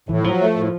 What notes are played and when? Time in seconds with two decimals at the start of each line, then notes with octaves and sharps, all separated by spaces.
0.09 A2 E3
0.24 F3 F#3
0.41 A3
0.56 A2